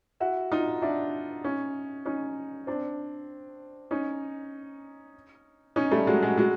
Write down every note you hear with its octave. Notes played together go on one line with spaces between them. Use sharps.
E4 F#4
D#4 F4
D4 E4
C#4 D#4
C#4 D#4
C4 D4
C#4 D#4
C#4 D#4
G3 A3
F#3 G#3
F#3 G#3
F#3 G#3